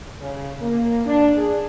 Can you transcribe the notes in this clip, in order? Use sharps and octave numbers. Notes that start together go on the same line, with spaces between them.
C#3
A#3
D4
G#4